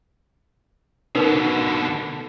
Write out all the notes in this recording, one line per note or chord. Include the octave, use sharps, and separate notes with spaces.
B2 D3 D#4 A#4 B4